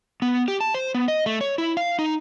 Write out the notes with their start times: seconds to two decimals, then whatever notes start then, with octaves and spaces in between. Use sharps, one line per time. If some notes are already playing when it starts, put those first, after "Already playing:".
0.22 B3
0.48 G4
0.61 A5
0.74 C5
0.94 B3
1.08 D#5
1.26 A3
1.41 C#5
1.58 E4
1.77 F5
1.99 D#4